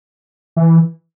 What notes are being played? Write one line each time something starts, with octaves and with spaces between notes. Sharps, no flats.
E3